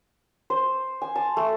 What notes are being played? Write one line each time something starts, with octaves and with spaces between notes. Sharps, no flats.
C5
G#5
A5
A3